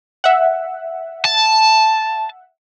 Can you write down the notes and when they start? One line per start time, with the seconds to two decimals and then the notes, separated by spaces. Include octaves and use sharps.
0.24 E5 F#5
1.25 A5